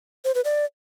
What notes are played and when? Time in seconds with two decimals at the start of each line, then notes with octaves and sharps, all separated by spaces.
0.25 C5
0.35 B4
0.45 D5